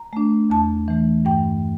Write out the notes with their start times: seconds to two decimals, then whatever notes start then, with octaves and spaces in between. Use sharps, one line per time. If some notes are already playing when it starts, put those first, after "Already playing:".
Already playing: A#5
0.13 A3 D4
0.50 E2 A5
0.88 E3 A3
1.25 G2 G5